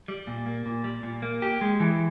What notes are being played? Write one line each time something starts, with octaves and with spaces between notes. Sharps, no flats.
G3
A#2
A#3
A#2
G3
A#2
A#3
G4
G#3
E3